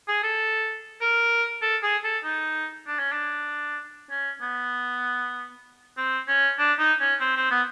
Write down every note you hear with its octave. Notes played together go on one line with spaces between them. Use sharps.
G#4
A4
A#4
A4
G#4
A4
D#4
D4
C#4
D4
C#4
B3
C4
C#4
D4
D#4
C#4
C4
C4
B3